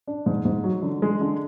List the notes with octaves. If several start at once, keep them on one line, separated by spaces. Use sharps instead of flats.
D4
G#2
G#2
F#3
D3
G#3
D3